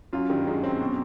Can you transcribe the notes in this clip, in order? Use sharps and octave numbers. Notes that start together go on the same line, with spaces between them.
F#2 F#3 F4
G2 D#3 G3
F#2 F#3 G#3
C4
B2